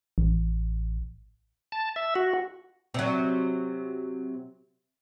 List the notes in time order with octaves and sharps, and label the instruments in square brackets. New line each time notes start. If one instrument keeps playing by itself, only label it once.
[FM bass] A1
[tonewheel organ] A5
E5
F#4
[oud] C3 F#3